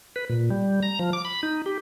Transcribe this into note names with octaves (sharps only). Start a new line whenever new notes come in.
B4
A#2
G3
A#5
F3
D6
B5
D#4
G4